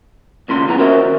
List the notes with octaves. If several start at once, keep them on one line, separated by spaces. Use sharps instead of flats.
D#2 A#2 C#3 C6
B1 F#2 E3 B3 A#5
C#4 F#4 A#4 C5 E5
D#3